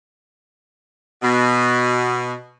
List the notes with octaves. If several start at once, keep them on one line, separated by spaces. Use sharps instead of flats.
B2